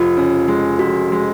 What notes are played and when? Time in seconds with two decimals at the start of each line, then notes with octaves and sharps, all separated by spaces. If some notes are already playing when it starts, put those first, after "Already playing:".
Already playing: F1 F4
0.17 C#3
0.48 G#3
0.79 F1 F#4
1.12 G#3